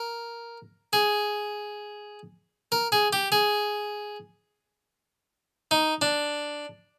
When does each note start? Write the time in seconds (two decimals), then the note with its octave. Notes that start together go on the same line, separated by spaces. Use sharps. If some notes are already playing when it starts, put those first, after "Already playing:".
Already playing: A#4
0.93 G#4
2.72 A#4
2.92 G#4
3.13 G4
3.32 G#4
5.71 D#4
6.02 D4